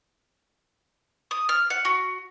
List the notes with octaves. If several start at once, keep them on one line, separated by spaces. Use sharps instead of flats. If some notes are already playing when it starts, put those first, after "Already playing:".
D#6
F6
F#5
F#4